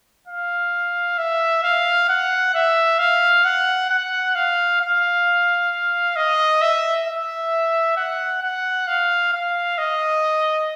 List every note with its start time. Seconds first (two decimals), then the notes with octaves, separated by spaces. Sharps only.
0.28 F5
1.18 E5
1.63 F5
2.09 F#5
2.54 E5
2.99 F5
3.45 F#5
3.90 F#5
4.35 F5
4.80 F5
6.16 D#5
6.62 E5
7.07 E5
7.97 F#5
8.42 F#5
8.87 F5
9.33 F5
9.78 D#5